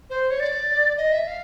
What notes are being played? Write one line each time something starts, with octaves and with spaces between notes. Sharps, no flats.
C5
C#5
D5
D#5
E5
F5